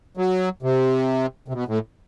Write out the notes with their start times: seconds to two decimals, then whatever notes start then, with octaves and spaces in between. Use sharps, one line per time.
0.17 F#3
0.63 C3
1.48 C3
1.54 B2
1.68 A2